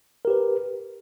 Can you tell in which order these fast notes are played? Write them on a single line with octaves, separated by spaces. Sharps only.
A#4 G4 B4